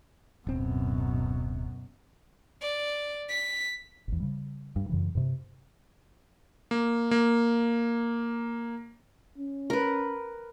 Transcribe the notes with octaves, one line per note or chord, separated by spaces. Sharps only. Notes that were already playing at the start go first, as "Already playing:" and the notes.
D1 F#2 B2 C4
D5
B6
G#1 E2
C#3 G3
G2
F#2 C#3 E3
G2 C3
A#3
A#3
C#4
A#4 B4